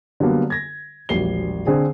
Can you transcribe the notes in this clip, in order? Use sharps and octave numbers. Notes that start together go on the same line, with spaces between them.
D3 F#3 G3 A#3 B3
G#6 A#6
E1 A#1 F#3 G3 C7 G7
D3 C4 G#4